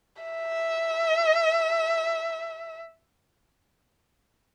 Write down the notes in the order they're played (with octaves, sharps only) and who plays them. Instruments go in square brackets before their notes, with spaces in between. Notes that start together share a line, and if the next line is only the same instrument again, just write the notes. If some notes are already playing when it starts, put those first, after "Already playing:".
[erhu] E5